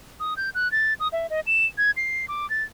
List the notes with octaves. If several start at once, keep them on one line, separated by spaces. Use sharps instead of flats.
D#6
G6
F#6
A6
D#6
E5
D#5
E7
G#6
C7
D6
A6